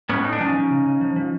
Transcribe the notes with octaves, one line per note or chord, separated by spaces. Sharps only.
A2 B3 C#4
A2 D#4
D4
F3 C#4 D#4
F3
C#3
C#3
F3
F3